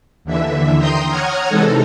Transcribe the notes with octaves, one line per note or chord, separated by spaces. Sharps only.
D#2 D3 E3 E5
G5 A#5 C6 D#6 G6
C#5 F#5 A#5 D#6 F6 G#6
C3 E3 G#3 D#4 A4